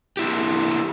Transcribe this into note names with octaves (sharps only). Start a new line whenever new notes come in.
A#3 E4 G4